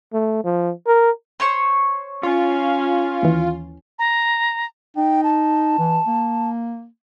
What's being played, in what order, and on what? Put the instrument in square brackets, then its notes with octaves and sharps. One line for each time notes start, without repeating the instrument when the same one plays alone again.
[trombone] A3
F3
A#4
[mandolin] C5 C#5 C#6
[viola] C#4 [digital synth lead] F4
[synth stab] D#2 E3
[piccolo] A#5
[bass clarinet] D#4 [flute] G5
[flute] A5
[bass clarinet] E3
A#3